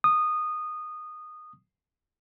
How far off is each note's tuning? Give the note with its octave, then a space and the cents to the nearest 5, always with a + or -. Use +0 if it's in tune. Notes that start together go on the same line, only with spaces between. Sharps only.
D#6 -15